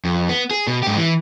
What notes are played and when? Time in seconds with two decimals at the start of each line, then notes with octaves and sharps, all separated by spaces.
0.05 F2
0.29 B3
0.51 G#4
0.67 B2
0.83 G#2 G4
0.97 E3